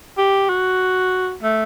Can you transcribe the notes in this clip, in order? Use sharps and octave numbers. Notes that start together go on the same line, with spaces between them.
G4
F#4
A3